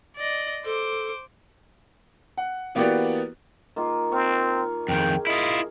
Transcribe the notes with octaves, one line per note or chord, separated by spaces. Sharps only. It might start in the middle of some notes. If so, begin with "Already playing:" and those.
D5 D#5
A4 C5 D6
F#5
E3 A#3 B3 F#4 G4 D5
D#3 A#3 F4
C4 C#5 F5 C#6
F2 D#3 G#4 G5
E4 F4 D#5